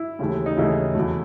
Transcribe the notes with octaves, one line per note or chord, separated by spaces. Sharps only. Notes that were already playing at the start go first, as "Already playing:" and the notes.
Already playing: E4
D#2 C#3 E3 A3
D#4
D#2 C#3 E3 A3 E4
E2 B2 F#3 A3